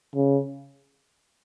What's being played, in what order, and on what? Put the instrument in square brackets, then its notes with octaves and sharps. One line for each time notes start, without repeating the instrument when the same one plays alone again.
[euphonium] C#3